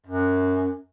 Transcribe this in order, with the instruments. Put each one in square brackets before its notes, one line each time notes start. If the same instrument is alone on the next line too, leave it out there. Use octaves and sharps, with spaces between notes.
[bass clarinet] F#2